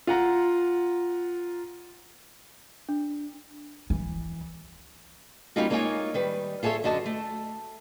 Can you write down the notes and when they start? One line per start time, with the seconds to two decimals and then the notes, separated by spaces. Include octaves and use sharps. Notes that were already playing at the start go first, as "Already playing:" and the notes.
0.07 F4 F#5 A#5
2.89 D4
3.90 E3
5.56 G3 A#3 C#4 D#4 F4 F#4
5.70 G#3 A#3 D#4 F4 C#5 G#5
6.14 D#3 G3 B4
6.63 F4 G#4 A4 C#5 E5
6.84 F#2 D3 F#4 D#5 A5
7.06 A3